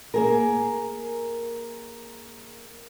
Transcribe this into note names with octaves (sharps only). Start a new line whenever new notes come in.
A#3 G#4 A#4